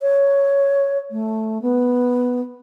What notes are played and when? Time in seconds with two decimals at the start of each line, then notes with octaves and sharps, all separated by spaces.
0.01 C#5
1.11 A3
1.62 B3